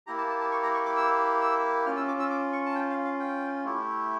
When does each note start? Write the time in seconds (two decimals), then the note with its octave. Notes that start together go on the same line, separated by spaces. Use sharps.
0.07 A#3 E4 G4 A#5
0.18 A5
0.29 A5
0.40 A5
0.51 C#6
0.63 A#5
0.74 C#6
0.85 D6
0.96 E6
1.41 E6
1.86 C#4 F4 F6
1.97 E6
2.08 D6
2.19 E6
2.30 D6
2.53 C#6
2.66 A5
2.75 G5
2.90 F5
3.05 F5
3.20 G5
3.64 A3 E4 G4